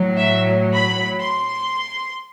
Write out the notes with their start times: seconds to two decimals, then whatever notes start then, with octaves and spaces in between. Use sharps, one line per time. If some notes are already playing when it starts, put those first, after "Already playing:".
Already playing: A2 F#3
0.17 E5
0.75 B5
1.19 C6